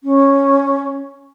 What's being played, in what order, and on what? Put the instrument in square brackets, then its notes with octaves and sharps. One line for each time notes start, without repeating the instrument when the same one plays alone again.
[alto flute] C#4